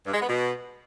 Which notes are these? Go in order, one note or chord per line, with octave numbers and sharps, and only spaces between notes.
G2
G#3
B3
B2